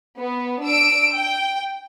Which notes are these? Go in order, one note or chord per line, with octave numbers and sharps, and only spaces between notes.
B3
D4 E6 D7
G5